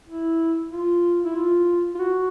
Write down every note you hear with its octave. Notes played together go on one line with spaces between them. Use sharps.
E4
F4
E4
F4
F4
F#4